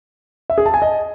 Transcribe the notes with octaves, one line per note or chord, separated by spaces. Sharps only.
E5
G#4
A5
G#5
D#5